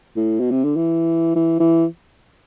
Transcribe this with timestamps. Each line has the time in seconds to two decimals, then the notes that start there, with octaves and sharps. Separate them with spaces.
0.16 A2
0.40 B2
0.51 C3
0.64 D3
0.76 E3
1.35 E3
1.60 E3